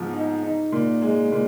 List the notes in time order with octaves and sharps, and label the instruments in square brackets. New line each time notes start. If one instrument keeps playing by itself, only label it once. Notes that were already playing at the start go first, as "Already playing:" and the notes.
Already playing: [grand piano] G#2 F3 B3
D#4
D#4
A#2
G#3
A#2